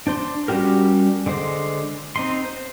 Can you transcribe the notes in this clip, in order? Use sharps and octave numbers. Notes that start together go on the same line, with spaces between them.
D4 C5 C6
G3 C#4 F#4 G4 A#4
D3 G#3 C5
C4 D#4 C6
C5